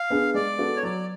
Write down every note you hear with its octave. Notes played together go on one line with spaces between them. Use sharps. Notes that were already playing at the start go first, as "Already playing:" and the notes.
Already playing: F5
B3 D4 G#4
G#3 D5
B3 F#4 A4
C#5
F#3 D5